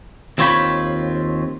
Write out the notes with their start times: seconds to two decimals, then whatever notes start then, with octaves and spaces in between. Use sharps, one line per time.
0.38 D#2 C4 F4 C#5 G5 B5